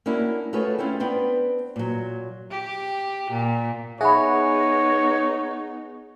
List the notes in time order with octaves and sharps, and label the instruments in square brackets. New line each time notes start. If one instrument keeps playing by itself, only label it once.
[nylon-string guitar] A#3 C#4 D4 E4 F#4
A3 F4 F#4 G#4 B4 C#5
C4 C#4 E4 F4
B3 C4 D4 B4 C5
A#2 F#3
[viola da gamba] G4
A#2
[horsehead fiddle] B3 D#4 [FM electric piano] G#4 F#5 [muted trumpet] C#5 [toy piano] E5 B5